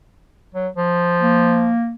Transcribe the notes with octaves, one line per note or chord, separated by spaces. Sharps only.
F#3
F3
A#3